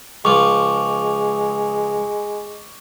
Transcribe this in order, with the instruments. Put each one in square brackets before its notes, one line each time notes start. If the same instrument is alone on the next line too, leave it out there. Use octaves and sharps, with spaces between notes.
[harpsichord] C#2 F3 [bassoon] G#3 [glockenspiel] C#6 D6